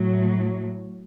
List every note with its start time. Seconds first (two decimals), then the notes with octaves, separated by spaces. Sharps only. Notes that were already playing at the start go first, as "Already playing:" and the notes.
Already playing: A2 F#3